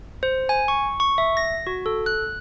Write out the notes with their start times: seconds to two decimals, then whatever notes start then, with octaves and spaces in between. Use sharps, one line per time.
0.23 C5
0.49 G#5
0.68 C#6
1.00 C#6
1.18 E5
1.37 A#6
1.67 F#4
1.86 A4
2.06 F#6